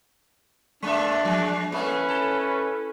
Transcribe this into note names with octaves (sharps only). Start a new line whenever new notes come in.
G#3 A#3 D4 E5
F3 G#3
A3 A#3 C#4 E4 B4
A4